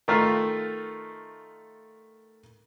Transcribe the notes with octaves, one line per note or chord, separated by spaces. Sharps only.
D#3 A3 F4